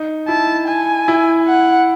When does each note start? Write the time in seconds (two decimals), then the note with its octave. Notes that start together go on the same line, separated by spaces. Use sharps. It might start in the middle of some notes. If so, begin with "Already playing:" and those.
Already playing: D#4
0.28 E4 A5
0.68 G#5
1.08 E4
1.48 F#5